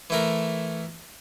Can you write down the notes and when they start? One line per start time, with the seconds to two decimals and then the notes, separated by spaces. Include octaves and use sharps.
0.10 E3 A3 E4 A#4